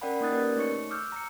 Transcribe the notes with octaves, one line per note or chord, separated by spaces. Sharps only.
C#4 A#4 D5 F#5 G5 B5
A#3 D#4 D#6 F#6 A6
C#4 G4 A#4 B4 D5
A3 D#4 C#5 C#6 C#7
D6 E6 F6 G6
A#5 C#7